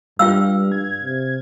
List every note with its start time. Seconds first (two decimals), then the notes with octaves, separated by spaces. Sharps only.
0.19 G2 G3 F4 F5 G5 E6
0.72 G#6
1.03 C3